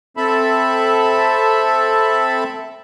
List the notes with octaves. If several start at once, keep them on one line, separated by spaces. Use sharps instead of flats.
C4 A4 E5 A5 B5